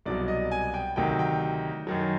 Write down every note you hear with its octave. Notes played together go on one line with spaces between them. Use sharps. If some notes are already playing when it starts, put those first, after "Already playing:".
C2 B2 F#3 D5
D#5
G#5
G5
D2 C3 D#3 F#3 G5
G5
F#2 D#3 F#3